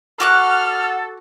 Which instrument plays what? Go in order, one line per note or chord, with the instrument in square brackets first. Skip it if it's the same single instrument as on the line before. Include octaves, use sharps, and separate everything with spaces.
[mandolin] F#4 D6 F#6 [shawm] A4 [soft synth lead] F#5 [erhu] F6